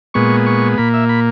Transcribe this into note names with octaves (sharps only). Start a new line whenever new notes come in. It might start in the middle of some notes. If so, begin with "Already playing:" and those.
A#2 G#3 B3 C#6
C#6
A#2 A#3 B5
E5
B5